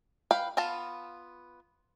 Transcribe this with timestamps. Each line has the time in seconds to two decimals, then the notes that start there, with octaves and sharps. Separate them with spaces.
0.31 B4 F5 G5
0.57 B3 F4 F5 A5